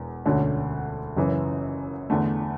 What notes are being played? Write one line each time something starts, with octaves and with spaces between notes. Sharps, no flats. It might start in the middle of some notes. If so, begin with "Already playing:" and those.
Already playing: E1 E2
E1 D2 D3 A3 C#4
F#1 F#2 C#3 E3
E2 D3 A3